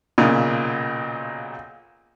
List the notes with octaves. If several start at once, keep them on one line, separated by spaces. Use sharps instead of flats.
B1 A#2 C#3